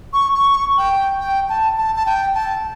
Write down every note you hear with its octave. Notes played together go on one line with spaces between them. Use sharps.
C#6
C#6
G5
G5
A5
A5
A5
G5
A5